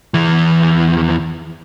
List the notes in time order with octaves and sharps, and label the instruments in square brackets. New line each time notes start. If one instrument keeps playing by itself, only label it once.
[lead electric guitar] E2 E3